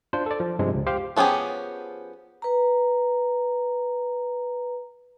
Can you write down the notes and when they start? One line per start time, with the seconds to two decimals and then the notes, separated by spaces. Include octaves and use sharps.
0.13 D4 F4 C5
0.26 A4 D5
0.40 F3
0.59 G2 C3 F3 G#3
0.74 C#2
0.86 G4 C5 F5
1.16 F3 B3 C#4 G4 G#4
2.42 B4 A#5